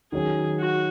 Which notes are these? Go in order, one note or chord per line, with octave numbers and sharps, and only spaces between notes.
D#3 F#3 C#4 G#4
F#4